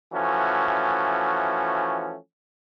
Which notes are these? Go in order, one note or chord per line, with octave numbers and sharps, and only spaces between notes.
E3 F3 A3 C#4 F#4